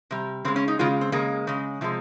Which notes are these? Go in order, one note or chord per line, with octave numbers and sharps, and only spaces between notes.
C3 G3
C#3 G#3 C4
C#4
D#4
C#3 G#3 F4
C4
C#3 G#3 A#3
C#3 G#3
C3 F3 G#3